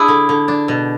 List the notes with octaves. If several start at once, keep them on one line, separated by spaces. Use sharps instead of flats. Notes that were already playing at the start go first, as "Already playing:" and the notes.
Already playing: D4 E4 G#4
D3
D3
D4
B2